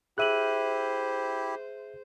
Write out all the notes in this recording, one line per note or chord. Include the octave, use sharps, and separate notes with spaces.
E4 G4 G#4 C5 E5 F#6 D#7 F#7